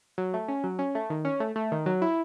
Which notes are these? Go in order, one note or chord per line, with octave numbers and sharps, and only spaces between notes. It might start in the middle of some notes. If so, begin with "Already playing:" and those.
F#3
A3
C#4
F#3
C#4
A3
D#3
C#4
A3
A3
D#3
F#3
E4